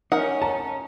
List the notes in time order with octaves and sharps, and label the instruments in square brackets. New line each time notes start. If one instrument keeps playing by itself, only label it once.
[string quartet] C#4 [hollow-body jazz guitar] D#4 [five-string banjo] A#4 F#5
[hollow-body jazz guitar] A5 [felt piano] A#5